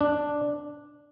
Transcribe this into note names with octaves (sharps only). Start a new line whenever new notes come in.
D4